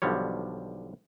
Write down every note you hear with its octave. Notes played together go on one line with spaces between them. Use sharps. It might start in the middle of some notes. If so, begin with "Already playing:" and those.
B1 D3 F3 G3 C#5